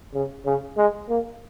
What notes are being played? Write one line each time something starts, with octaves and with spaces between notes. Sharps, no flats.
C#3
C#3
G#3
A#3